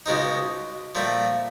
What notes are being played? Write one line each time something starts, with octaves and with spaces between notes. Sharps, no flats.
C#2 B2 G#3 C4 D#4
A#2 F3 A3 C4